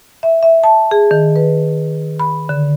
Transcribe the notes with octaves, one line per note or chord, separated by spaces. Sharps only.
E5
E5
A5
G#4
D#3
B4
B5
D3